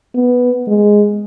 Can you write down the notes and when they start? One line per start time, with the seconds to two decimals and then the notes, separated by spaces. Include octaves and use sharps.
0.15 B3
0.68 G#3